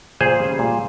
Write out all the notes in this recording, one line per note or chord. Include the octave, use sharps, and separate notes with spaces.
A#2 G#4 C5
G3 C#4
A#2